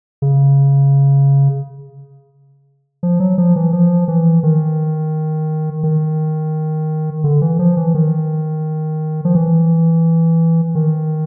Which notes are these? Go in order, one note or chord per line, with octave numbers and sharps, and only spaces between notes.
C#3
F3
F#3
F3
E3
F3
E3
D#3
D#3
D3
E3
F3
E3
D#3
F3
E3
D#3